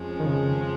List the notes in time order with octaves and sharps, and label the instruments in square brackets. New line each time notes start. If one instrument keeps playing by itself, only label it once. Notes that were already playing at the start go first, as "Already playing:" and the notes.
Already playing: [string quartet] F2 F3 G#3 C#4
[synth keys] D#3
C#3